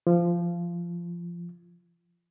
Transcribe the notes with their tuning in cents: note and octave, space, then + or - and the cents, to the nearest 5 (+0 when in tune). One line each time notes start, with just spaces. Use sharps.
F3 -15